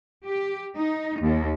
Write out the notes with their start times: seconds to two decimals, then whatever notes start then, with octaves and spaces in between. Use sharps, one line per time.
0.25 G4
0.76 D#4
1.21 D#2